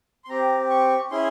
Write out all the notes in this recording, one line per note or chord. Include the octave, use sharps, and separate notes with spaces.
C6
C4 G4 A#5
C#6
C#4 E4 G#4 C6